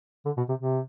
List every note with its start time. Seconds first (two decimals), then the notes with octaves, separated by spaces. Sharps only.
0.25 D3
0.37 B2
0.49 C3
0.60 C3